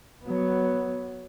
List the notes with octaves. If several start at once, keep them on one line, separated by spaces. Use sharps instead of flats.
F#3 B3